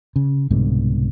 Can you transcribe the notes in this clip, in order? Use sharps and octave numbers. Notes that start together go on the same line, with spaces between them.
C#3
C2 G#2 B2 D3